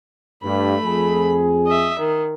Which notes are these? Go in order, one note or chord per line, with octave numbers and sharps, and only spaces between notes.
G2 A3 B5
F2 G#4
D#5 E5
D#3